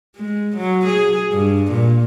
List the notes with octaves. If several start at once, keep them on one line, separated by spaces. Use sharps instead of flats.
G#3
F#3
G#4
G2
A#2